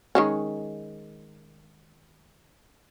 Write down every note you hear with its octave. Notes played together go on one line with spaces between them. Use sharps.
D#3 G#3 C#4